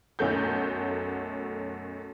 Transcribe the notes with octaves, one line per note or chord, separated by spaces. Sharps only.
B1 F#2 F#3 A3 G6